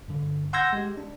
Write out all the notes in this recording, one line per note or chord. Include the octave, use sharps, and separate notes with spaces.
G2 D3
F#5 C6 E6 G6 G#6 A#6
G#3 G4
D4